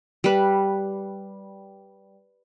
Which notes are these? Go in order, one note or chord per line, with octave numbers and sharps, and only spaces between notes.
G3 B4